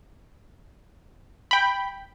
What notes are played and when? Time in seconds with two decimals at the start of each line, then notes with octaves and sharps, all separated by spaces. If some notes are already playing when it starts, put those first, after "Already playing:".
1.51 G5 B5